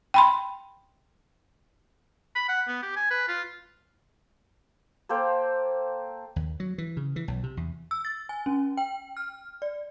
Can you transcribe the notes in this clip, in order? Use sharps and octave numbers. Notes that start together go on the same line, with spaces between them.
G5 B5 C6
B5
F#5
B3
G4
G#5
B4
F4
A#3 A4 C5 G5
D#2
F#3
E3
C#3
E3
B1
C3
E2
E6
A6
G#5
C#4
G5
F6
D5